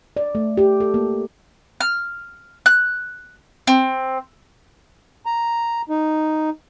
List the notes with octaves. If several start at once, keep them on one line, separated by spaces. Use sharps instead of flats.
D5
A3
G4
A4
A#3
F6
F#6
C4
A#5
D#4